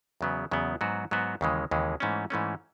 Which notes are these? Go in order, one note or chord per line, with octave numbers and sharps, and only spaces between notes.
E2 C#3 F#3 B3
E2 C#3 F#3 B3
G#2 F#3 B3 F#4
G#2 F#3 B3 F#4
D#2 C#3 E3 G#3
D#2 C#3 E3 G#3
G#2 E3 A3 C#4
G#2 E3 A3 C#4